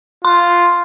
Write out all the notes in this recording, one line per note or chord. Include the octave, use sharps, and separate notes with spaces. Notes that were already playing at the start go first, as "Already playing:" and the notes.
F4 C6